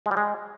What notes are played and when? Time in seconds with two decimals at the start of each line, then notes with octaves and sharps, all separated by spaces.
0.06 G#3
0.11 G3
0.17 G#3